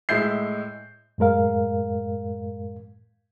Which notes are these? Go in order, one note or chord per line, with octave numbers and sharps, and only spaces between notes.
A2 G#3 E5 G6 C7
F#2 A2 G#3 A#4 F5